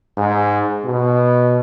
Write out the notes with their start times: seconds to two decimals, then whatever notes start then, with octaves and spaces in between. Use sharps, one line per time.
0.17 G#2
0.85 B2